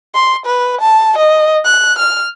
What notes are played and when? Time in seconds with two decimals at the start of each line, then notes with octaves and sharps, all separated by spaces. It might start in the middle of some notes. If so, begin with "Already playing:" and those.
0.14 C6
0.46 B4
0.81 A5
1.18 D#5
1.65 F#6
1.99 F6